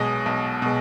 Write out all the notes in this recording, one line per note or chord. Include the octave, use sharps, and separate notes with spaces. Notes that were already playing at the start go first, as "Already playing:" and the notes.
Already playing: B1 B2 G#3 D#5 D#6
B1
B2 G#3